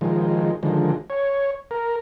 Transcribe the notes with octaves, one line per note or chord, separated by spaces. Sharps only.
D#3 F3 G#3
D3 D#3 F3 G#3
C#5
A#4